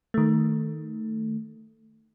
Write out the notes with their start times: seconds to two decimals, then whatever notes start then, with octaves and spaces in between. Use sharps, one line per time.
0.14 D#3 A3